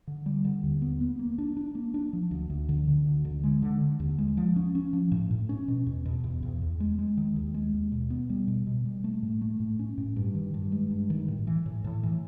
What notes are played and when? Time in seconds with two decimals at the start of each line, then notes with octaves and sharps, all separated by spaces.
0.07 D3
0.26 G3
0.45 D3
0.63 D#2
0.82 B3
1.01 B3
1.19 A#3
1.38 D4
1.57 D4
1.75 A#3
1.94 D4
2.13 F3
2.31 D2
2.50 D2
2.69 D3
2.88 D3
3.06 D2
3.25 D3
3.44 G#3
3.62 D3
3.81 D3
4.00 D#2
4.18 G#3
4.37 F3
4.56 C#4
4.75 C#4
4.93 F3
5.12 A2
5.31 A2
5.49 C#4
5.68 B2
5.86 E2
6.05 B2
6.24 E2
6.43 E2
6.62 E2
6.80 G#3
6.99 G#3
7.17 D#3
7.36 D#2
7.54 G#3
7.74 D#2
7.92 B2
8.10 B3
8.29 G3
8.48 B2
8.67 B2
8.85 G3
9.04 A3
9.23 A2
9.41 A3
9.60 A2
9.79 C#4
9.98 A2
10.16 G2
10.35 D#3
10.54 G2
10.72 G#3
10.91 G2
11.10 D#3
11.28 A2
11.47 E3
11.66 A2
11.84 A2
12.03 E3